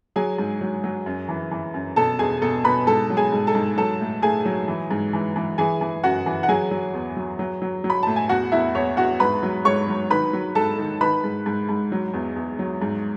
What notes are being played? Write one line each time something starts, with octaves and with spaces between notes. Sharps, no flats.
F#3 G#4 G#5
G#2
F#3
F#3
F#2
E3
E3
F#2
B2 A4 A5
E2 G#4 G#5
B2 A4 A5
B2 B4 B5
G#2 A4 A5
F#3
G#4 G#5
G#2
A4 A5
G#2
F#3 A4 A5
A2
A2 G#4 G#5
F#3
E3
G#2
E3
E3
E3 G#4 G#5
E3
F#2 F#4 F#5
E3
F#5
F#3 G#4 G#5
F#3
E2
F#3
F#3
F#3
F#3
B5
A2 A5
G#5
E2 F#4 F#5
E2 E4 E5
E2 C#5
E2 F#4 F#5
G#2 B4 B5
F#3
G#2 C#5 C#6
F#3
D#3 B4 B5
F#3
G#2 A4 A5
D#3
D#3 B4 B5
G#2
G#2
G#2
F#3
E2
E2
F#3
G#2